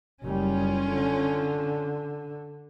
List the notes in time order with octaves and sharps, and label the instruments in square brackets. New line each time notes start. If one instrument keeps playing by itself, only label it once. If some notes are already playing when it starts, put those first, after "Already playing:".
[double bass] F#1 G3 [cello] C#4 F4
[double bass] D3